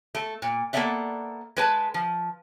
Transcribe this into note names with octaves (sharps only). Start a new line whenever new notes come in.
A3
A#2
A#3 B3 A4 D5 E5 F#5
G#3 B4 A5
F3